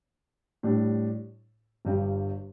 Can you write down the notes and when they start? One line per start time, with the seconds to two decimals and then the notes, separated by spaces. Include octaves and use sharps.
0.63 A2 G3 D4
1.85 G1 G2 G3